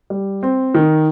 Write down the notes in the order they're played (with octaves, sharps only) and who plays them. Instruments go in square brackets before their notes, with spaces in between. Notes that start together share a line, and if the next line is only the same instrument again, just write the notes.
[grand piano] G3
C4
D#3